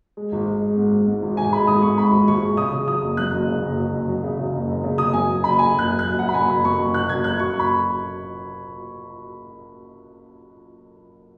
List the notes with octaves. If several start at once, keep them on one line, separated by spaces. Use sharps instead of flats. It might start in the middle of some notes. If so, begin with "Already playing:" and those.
G#3
G#1
G#3
G#3
G#2
G#1
G#2
G#1
G#1 G#5
G#3 B5
G#1 D#6
G#2 C#6
G#2 B5
G#1
G#1 C#6
G#3
C#3 D#6
C#3
F#3 D#6
F#1
F#2 F#6
F#1
C#3
F#1
F#3
F#1
F#3
C#3
C#3
F#1
F#1
C#3
F#1 D#6
F#2 G#5
F#3
F#1 B5
F#3 G#5
F#1 F#6
F#3
F#1 F#6
F#3 F#5
B5
F#1 G#5
F#1 B5
F#2 C#6
F#1
F#3 F#6
F#1 G#6
F#3 F#6
F#3 C#6
F#1 B5